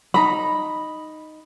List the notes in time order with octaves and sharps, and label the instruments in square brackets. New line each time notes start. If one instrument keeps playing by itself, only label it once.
[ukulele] D#4 A#5 B5